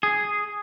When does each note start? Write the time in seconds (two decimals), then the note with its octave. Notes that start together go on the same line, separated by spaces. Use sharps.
0.03 G#4